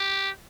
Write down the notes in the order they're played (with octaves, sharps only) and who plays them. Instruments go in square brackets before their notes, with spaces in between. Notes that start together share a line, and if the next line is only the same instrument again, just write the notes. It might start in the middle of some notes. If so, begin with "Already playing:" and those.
Already playing: [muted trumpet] G4